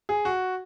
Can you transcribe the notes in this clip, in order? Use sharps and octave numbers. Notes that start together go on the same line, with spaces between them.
G#4
F#4